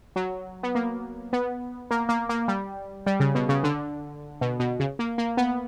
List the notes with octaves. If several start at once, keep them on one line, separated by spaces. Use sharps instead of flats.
F#3
B3
A#3
B3
A#3
A#3
A#3
G3
G3
C#3
B2
C#3
D3
B2
B2
C#3
A#3
A#3
B3